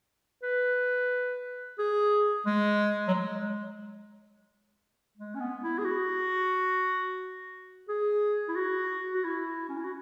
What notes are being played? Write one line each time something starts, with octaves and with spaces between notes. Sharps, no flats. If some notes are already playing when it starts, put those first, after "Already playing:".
B4
G#4
G#3
F#3
G#3
G#3
C#4
B3
E4
G#4
F#4
G#4
E4
F#4
F#4
E4
C#4
E4
F#4